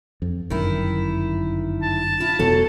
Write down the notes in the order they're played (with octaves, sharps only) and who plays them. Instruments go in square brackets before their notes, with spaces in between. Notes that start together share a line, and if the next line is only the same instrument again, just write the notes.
[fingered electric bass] F2
[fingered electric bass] G1 F#2 [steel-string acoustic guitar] D#3 E4
[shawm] A5
[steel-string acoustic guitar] E4 F4
[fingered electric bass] E1 E2 B2 [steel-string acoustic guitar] F#3 A4